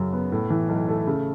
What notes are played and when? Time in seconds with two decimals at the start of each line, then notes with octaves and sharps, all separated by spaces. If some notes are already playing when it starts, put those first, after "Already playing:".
Already playing: F#2 C#3 F#3
0.13 B3
0.32 A2
0.50 E3
0.69 B1
0.89 A3
1.07 C#3